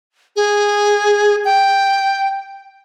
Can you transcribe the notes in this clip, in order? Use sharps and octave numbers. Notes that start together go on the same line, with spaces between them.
G#4
G5